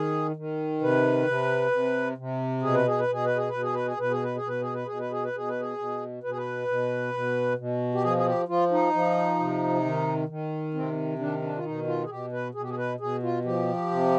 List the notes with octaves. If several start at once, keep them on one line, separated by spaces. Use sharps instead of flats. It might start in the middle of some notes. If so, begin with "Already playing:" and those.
Already playing: D#3 G#4
D#3
C3 B4
C3
C3
C3
B2 G#4
B4
G#4
B4
B2 G#4
B4
G#4
B2 B4
G#4
B4
G#4
B2 B4
G#4
B4
G#4
B2
B4
G#4
B4
B2 G#4
B4
G#4
B4
B2 G#4
B4
G#4
B2
B2 B4
G#4
B4
B2
B2
B2
G4
F3 G#4
G#4
G4
F3 F4
D#4
F3
C3
D#3
D#3
C3 C4
D#3 D4
D4
F4
B2 D#4
F4
G#4
B2 G4
B4
B2 G#4
G4
G#4
B4
B2 G#4
F4
F3 G4
C3